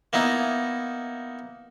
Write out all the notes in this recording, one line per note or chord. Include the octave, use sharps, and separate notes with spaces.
A#3 B3 D#4 E4